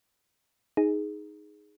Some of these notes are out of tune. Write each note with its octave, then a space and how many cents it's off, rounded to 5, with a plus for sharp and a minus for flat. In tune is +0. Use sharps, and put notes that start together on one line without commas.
D#4 +0 G#4 +0